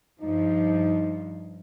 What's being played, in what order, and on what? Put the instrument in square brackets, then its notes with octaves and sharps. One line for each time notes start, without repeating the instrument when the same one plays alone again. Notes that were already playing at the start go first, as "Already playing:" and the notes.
[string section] G2 F3 [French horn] D#4